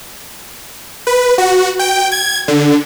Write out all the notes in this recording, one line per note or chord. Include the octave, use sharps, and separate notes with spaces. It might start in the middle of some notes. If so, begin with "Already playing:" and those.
B4
F#4
G5
G#6
D3